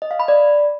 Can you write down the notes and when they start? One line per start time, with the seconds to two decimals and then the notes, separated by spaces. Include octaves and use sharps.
0.02 D#5
0.11 F5
0.20 B5
0.28 D5